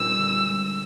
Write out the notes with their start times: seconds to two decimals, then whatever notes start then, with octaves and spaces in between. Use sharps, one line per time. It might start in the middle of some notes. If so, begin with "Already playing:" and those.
Already playing: A#2 G3 E6
0.18 D3
0.47 G#3